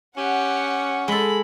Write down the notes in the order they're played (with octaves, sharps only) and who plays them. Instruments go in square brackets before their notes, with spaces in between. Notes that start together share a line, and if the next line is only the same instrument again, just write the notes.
[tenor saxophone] C#4 [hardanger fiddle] G4 [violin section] F#5
[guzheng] G#3 A4 [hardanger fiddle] B5